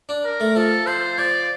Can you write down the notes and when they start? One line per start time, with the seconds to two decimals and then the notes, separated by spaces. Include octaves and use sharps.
0.09 D4
0.24 A#4
0.40 A3
0.55 F3 A4
0.86 F3 C5
1.18 F3 D5